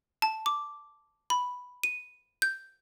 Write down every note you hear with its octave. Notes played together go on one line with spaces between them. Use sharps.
A5
D6
B5
D#7
G6